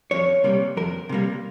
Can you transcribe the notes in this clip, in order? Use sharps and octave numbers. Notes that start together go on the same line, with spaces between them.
F2 C#5
C3 G3 A#3
F2 A#4
C3 G3 A#3